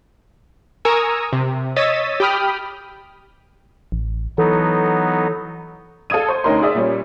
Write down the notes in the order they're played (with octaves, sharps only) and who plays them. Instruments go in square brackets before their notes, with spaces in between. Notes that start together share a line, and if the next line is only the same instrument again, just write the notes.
[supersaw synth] A#4 G#5 A#5 C#6 D#6 E6
C3
C#5 D#5 E6 A6 B6 D#7
G4 G5 B5 D#6 F6
[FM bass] A1
[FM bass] E3 [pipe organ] F#3 B3 D#4 [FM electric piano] A4
[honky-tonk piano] A4 F5 D#6 G#6 D#7
C5 C#6
D2 C#4 D#4 A#4 C6
G#4 D5 E5 D#6
A#2 G3 C#4